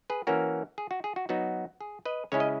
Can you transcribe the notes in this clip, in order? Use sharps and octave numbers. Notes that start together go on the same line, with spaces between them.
G#4 B4
E3 A#3 C#4 F#4 A#4
G#4
F#4
G#4
F#4
F#3 B3 D#4 F#4
G#4
B4 D#5
C#3 G#3 C#4 E4 C#5
D#5